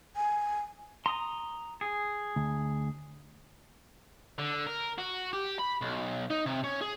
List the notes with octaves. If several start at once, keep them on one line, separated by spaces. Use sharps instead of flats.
G#5
A#5 C6 D#6
G#4
D2
D3
A#4
F#4
G4
B5
B1
D#4
C3
C#4
G#4